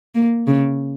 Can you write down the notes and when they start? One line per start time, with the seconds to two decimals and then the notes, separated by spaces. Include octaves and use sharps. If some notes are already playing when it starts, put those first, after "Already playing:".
0.15 A#3
0.47 C#3